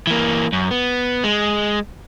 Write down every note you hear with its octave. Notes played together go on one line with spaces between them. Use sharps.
E3 A#3
F#2
B3
G#3